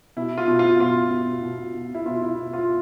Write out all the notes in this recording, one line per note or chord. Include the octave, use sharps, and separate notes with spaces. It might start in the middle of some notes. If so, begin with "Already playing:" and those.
B2 E4
F4
B2
F4
B2 F4
B2
B2
B2
E4
B2 F4
E4
B2
F4